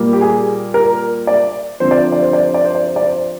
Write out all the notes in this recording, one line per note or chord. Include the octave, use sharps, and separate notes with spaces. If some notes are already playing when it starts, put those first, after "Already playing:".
Already playing: A#2 G3 A#3
G4
G#4
A#4
D5
D3 F3 C4 C5
D5
C5
D5
C5
D5
C5
D5
C5
D5
C5
D5
C5